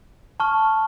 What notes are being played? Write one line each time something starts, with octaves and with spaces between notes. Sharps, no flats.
A5 C#6 F6